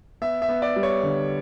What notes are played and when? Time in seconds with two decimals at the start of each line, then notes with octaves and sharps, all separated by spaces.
0.22 B3 E5
0.42 E5
0.49 B3
0.62 D5
0.76 G3
0.83 C#5
1.03 D3